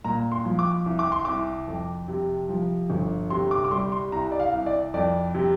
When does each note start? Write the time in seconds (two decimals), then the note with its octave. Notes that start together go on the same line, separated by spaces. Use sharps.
0.04 A#2 A#5
0.32 C6
0.45 F3
0.59 D6
0.86 C2
0.99 D6
1.12 C6
1.25 C2 D6
1.67 F2
2.08 C3
2.49 F3
2.90 G1
3.30 C3 C6
3.51 D6
3.65 D6
3.71 G3 C6
3.92 C6
4.12 C2 A#5
4.32 D5
4.40 F5
4.53 C2
4.66 D5
4.94 F2 D5
5.34 C3